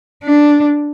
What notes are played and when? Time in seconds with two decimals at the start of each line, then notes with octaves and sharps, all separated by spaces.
0.24 D4